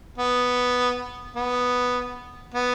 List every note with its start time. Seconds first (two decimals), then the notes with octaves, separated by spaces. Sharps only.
0.18 B3
1.36 B3
2.54 B3